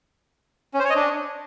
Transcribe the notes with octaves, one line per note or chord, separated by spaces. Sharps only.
C#4
C5
C#5
D#5
D4